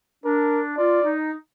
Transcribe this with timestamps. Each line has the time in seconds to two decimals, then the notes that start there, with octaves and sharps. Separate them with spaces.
0.25 D4 A#4
0.77 F4 D5
1.04 D#4